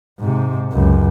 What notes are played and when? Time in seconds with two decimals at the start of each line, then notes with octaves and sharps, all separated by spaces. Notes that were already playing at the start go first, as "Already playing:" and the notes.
0.20 G#2 C3
0.72 C#2 F#2